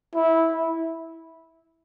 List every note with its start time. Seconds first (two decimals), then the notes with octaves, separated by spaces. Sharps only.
0.15 E4